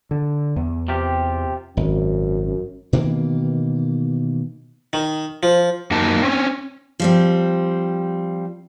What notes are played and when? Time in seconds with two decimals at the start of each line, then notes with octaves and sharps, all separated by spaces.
0.11 D3
0.56 E2
0.88 C3 F4 G4
1.77 G#1 F#2
2.93 B2 D#3 E3 A#3
4.93 D#3
5.43 F3
5.91 F#2 A#3 D#4 A5
6.23 C4 C#4
7.00 F3 G3 C4